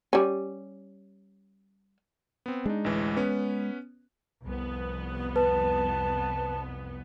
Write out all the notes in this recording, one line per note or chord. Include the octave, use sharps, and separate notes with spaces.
G3 C#4
B3 C4
G#3 D4 D#4
A1 D2 E3
B3 C#4 B4
C2 F2 B3
B4 A5